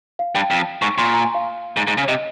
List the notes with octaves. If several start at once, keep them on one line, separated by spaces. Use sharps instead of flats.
F5
G2 G5
F2
G#2 C#6
A#2 C6
A#5
G#5
F5
G#2
G#2
C#3
C3 D#5